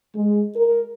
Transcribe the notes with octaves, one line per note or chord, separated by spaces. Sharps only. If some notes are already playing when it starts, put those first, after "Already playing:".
G#3
A#4